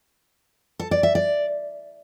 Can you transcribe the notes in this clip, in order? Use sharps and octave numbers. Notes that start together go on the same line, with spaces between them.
A4
D5
E5
D5